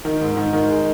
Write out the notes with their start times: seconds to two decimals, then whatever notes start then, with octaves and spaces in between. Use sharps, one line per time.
0.05 D#3
0.21 G#2
0.37 D#3
0.53 D#3
0.69 G#3